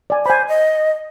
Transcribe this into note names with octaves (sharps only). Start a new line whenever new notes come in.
D5 G#5
C5 G#5 B5
D#5